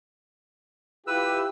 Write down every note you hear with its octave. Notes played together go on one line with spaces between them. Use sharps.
E4 F4 G4 B4 E6